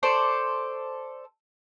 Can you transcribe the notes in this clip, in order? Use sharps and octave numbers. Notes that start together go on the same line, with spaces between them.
A4 C5 D5 C#6